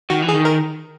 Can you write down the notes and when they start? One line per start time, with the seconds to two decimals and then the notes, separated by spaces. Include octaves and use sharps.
0.10 D#3 F#4
0.22 E3
0.29 G#4
0.34 D#3
0.45 A#4